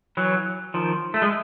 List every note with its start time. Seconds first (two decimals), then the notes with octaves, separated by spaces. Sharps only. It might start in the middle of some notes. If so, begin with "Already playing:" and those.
0.17 E3 F#3
0.74 D#3 F3
1.14 A3
1.22 G#3